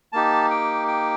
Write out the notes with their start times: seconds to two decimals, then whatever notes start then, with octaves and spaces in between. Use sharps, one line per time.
0.12 A#3 D#4 G4 A5
0.50 G5
0.88 G5